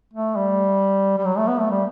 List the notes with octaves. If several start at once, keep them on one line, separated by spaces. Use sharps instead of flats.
A3
G3
G3
F#3
A3
B3
A3
G3